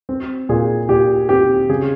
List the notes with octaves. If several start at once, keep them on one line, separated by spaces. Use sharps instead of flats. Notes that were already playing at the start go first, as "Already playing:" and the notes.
C4
A#2 G#4
A#2 G4
C4 G4
C#3 G#4